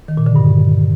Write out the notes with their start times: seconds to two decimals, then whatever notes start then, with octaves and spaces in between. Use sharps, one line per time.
0.08 D#3
0.17 A#2
0.26 D3
0.36 G2